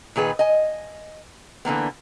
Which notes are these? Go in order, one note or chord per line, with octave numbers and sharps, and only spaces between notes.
A#2 D#3 G#4 B4
D#5 G#5
D3 E3 A#3 B3